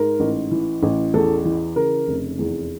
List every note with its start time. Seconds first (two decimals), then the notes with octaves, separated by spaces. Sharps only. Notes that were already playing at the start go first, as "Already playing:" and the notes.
Already playing: G#2 A#4
0.20 A1
0.51 E3
0.83 A1
1.14 E2 A4
1.45 E3
1.76 C#3 A#4
2.08 F1
2.39 E2